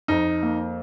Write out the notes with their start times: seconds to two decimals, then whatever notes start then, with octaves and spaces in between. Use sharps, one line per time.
0.08 F2 D#4
0.43 A#3